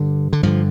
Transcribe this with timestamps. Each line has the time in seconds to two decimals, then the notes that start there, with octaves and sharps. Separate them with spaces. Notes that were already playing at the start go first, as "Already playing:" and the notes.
Already playing: G2 D3
0.33 D3
0.43 G2 D3 F3